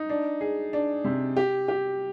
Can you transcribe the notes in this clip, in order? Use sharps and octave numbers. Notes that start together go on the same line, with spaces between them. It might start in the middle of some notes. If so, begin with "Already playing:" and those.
Already playing: D#4
D4
G#4
D4
C3
G4
G4